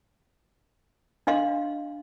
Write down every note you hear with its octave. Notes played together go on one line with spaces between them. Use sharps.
D4 D#5 F5 C6